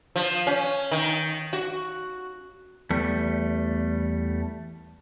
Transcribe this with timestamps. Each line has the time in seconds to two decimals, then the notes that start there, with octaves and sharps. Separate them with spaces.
0.16 F3
0.47 C#4
0.91 D#3
1.53 F#4
2.90 E2 G3 A3